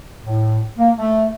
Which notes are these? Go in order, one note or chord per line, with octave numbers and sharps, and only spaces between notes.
A2
A#3
A3